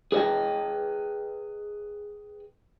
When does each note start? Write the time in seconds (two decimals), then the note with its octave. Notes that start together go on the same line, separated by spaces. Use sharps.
0.12 G#4 B4 D5 D#5 G5